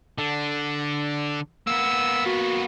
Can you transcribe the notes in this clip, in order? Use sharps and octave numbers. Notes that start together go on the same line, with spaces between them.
D3 D4
A#3 B3 E6
F#4